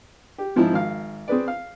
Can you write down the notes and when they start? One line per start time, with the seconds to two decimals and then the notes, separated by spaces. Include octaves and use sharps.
0.38 G4
0.56 G#2 F3 C4 D#4 E4
0.73 G#1 F5
1.28 C4 G#4 B4 D5
1.48 F5